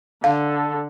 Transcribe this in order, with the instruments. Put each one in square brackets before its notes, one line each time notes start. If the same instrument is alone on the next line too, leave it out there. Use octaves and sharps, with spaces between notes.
[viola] D3 [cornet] A4 [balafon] F5